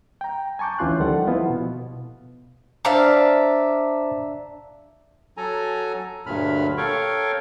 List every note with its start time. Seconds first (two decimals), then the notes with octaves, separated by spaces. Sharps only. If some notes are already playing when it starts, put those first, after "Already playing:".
0.21 G5 A#5
0.59 G#5 A5 C#6 D6 G6
0.79 D2 E3 C#4 F4 C6 F#6
1.00 D#3 F3 G3 A4 F#5
1.27 F3 B3 E4 F4
1.50 B2
2.85 D4 C5 E5 F5 A#5
5.37 F#3 A4 G#5 A#5
6.26 D2 G2 A#2 F#3 B5 F6
6.78 A4 A#4 C#5 F5 G5 C#6